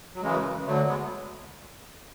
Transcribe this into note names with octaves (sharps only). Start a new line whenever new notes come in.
F#3
F#2 C#3 E3 G#3
D2 D3 F#3 A3
G#3 B3